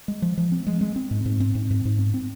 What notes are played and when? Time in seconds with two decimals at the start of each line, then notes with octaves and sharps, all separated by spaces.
0.08 G#3
0.22 F3
0.37 F3
0.52 C4
0.67 G#3
0.81 G#3
0.96 C4
1.11 G#2
1.26 G#2
1.40 C4
1.55 G#2
1.70 G#2
1.85 G#2
1.99 C4
2.14 C4